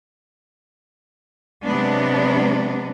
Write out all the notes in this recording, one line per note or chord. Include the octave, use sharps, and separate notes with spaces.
C3 F#3 G#3 B3 D4